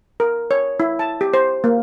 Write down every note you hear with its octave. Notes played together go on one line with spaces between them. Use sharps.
A#4
C#5
E4
A5
G4
C5
A#3